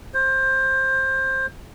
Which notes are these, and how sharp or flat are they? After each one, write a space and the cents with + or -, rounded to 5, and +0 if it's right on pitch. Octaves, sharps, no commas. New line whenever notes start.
C5 +20